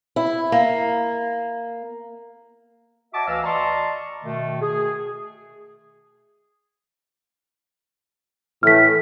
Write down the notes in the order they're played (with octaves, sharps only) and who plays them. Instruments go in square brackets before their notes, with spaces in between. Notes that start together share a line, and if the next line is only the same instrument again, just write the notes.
[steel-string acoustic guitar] E4
A#3
[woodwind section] F#4 C#5 D#5 E5 A5 D6
D2 E3 D#5 F5 E6
D5 D#5 A5 A#5 C6 C#6
B2 D#3 A3
G#4
[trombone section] A2 E3 A3 [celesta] F6 B6